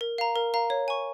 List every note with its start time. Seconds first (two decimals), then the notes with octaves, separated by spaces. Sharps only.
0.01 A#4
0.18 F5 A#5
0.36 A#4
0.54 F5 A#5
0.70 C#5
0.88 G#5 C#6